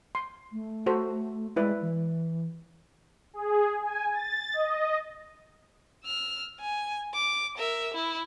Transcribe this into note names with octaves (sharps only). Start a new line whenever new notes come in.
C6
A3
F#4 A4 C5
G#3 E4 B4 D5
E3
G#4
G#5
A6
D#5
E6 F6
G#5
D6
A#4 E5
E4